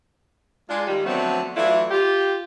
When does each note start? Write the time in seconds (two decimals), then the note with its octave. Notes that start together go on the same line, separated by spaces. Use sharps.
0.69 G#3 D4 F4
0.87 D#3 G3
1.06 D3 F3 F#3 A3 B3 C4
1.55 E3 F#3 A3 D4 E4 F4
1.91 F4 G4